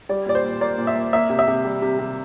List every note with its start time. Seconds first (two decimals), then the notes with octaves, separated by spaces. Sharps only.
0.09 G3 D5
0.26 A#2 D5
0.35 C5
0.44 A#2
0.61 A#3 D5
0.78 A#2
0.87 E5
0.95 A#3
1.13 A#3 E5
1.30 C3
1.39 E5
1.48 C3
1.65 G3
1.82 C3
1.99 C3